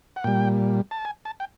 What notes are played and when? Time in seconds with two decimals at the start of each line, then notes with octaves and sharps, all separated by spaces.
0.16 F#5
0.24 A#2 G3 G5
0.91 A5
1.05 G#5
1.25 A5
1.40 G5